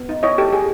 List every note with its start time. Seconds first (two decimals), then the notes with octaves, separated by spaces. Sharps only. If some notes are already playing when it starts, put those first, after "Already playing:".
Already playing: B3
0.09 D#4
0.23 E4 C#5 D#5
0.38 G4 A4
0.52 G4 G#4